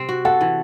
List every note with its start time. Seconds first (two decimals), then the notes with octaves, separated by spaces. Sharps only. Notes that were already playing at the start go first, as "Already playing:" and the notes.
Already playing: C3 C4
0.09 F#4
0.25 A4 F#5
0.41 E3